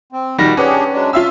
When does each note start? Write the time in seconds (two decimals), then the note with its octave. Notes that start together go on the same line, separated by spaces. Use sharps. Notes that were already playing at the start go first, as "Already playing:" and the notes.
0.13 C4
0.38 A#2 D#3 G3 F#4 A#6
0.57 C#4 D4 G4 G#4 B4 F#5
0.92 F#3 G#3 D4
1.13 F4 E5 F5 E6